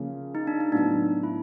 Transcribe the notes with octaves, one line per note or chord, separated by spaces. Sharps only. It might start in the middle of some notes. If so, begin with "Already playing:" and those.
Already playing: C#3 F3 A#3
D#4
D4
D#4
A2 F#3 B3 D4
E4